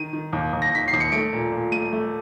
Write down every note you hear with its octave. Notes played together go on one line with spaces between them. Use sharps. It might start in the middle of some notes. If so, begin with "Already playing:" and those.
Already playing: D#3 D#7
D#3
D#2
D#2
A#6
D#3 B6
C7
D#2
C#7
A3 D7
A#2
A#2
A3 D#7
A3